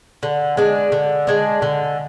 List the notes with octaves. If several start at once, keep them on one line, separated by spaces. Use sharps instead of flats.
D3
G#3 D4
D3
G#3 D4
D3